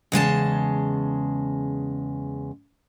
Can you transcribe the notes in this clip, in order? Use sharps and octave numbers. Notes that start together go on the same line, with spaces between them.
E2 C#3 G#3 A5